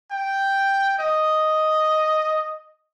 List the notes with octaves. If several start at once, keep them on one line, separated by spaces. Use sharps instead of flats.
G5
D#5